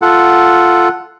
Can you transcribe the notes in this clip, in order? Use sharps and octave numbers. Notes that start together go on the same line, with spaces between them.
F4 A4 F#5